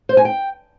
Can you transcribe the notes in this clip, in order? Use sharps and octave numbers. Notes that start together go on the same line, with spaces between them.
C5
G#5
G5